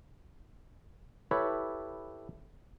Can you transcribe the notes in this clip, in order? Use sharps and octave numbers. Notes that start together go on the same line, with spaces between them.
E4 G4 A4 B4 C#5